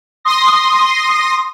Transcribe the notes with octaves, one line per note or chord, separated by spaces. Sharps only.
C6 D#6 A#6